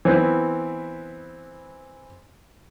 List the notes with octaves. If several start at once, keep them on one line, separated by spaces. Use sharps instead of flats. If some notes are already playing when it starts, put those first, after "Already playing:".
E3 B3 C4